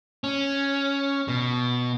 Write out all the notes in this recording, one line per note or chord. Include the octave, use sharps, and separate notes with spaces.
C#4
B2